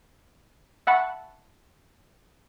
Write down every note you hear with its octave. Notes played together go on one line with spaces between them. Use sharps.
E5 F#5 A5 B5 C#6